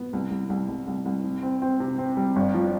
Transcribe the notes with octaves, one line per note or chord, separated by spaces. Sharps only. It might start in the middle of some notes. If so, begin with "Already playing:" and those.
Already playing: B3
C2
C2
C2
C2
C2
C2
C3
C4
C4
C3
C4
G3
G1
F3